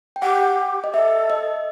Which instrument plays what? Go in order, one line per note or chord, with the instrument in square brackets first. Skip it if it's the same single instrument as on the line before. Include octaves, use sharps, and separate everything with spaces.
[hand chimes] G5
[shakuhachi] G4 [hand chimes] F#5
[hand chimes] D#5
[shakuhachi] A4 [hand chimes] E5
[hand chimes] D#5